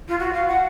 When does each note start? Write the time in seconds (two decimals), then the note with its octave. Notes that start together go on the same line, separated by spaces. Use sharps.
0.09 F4
0.19 F#4
0.33 F5
0.48 F#5